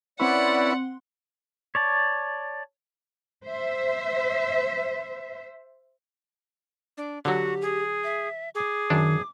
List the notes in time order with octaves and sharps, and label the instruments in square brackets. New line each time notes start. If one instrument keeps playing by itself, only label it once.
[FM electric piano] C4 C6 [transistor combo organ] C#4 E4 B4 [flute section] D5 [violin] F#5
[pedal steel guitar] C#5 D5 A5
[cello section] C5 E5
[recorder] D4
[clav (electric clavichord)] D3 F#3 [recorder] F#4 [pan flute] G4
[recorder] G#4
[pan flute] E5
[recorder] G#4 [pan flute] D6
[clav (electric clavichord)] F#2 D4 [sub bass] D#3